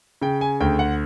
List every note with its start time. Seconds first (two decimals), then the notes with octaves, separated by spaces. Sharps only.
0.22 C#3 G5
0.41 G#5
0.60 D2 G5
0.79 F#5